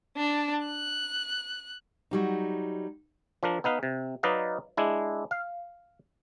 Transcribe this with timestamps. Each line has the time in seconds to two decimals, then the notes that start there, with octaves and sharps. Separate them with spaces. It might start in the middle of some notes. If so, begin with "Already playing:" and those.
0.17 D4
0.66 F#6
2.11 F#3 G3 D#4
3.43 F3 D4 A#4
3.64 B3 D#4 B4 F5
3.83 C3
4.23 F#3 D#4 B4 D5 D#5 F5
4.77 G#3 D4 E4
5.31 F5